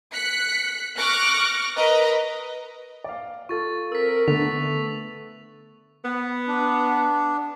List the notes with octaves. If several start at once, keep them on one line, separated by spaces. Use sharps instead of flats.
F#6 B6 C#7
C#6 D6 F6 F#6 A#6
A#4 B4 D#5 A#5
D5 F5
F4 A4 C#6 A6
C4 A#4 E6 B6
D3 A3 B3 A6 B6 F7
B3
D4